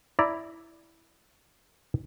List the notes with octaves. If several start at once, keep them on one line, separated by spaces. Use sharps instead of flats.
E4 D5 A#5